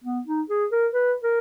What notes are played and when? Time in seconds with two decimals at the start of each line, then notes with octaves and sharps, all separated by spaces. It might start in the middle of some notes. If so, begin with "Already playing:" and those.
0.04 B3
0.26 D#4
0.50 G#4
0.72 A#4
0.93 B4
1.23 A#4